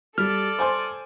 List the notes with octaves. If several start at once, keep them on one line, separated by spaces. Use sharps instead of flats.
G3 A4 D5 F6
C5 G#5 C6